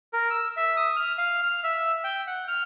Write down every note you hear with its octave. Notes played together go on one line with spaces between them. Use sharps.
A#4
E6
E5
D#6
F6
F5
F6
E5
G5
F#5
F6